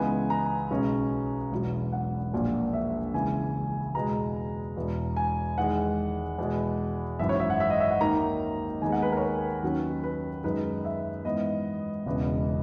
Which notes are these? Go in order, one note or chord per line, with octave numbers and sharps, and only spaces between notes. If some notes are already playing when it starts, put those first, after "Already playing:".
Already playing: C#2 C#3 E3 B3 D#4 G#5
A#5
B1 B2 G#3 C#4
E1 E2 B2 F#3
F#5
A#1 A#2 F#3 A#3
E5
C#2 C#3 E3 G#5
E2 B2 G#3 A#5
E1 E2 B2
G#5
E2 D#3 G#3 F#5
E2 B2 G#3
G#1 F#2 E3 E5
C#5
E5
F#5
E5
D#5
E5
F#5
D#2 D#3 A#3 D#4 A#5
D#2 D#3 G#3 B3 D#4 G#5
F#5
B4
A#4 C#5
B4
D#2 D#3 F#3 C#4
B4
F#2 D#3 G#3 D#4 B4
E5
G#2 E3 B3 D#5
E1 E2 C#3 E3 B3